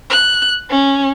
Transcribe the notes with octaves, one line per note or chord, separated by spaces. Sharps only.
F#6
C#4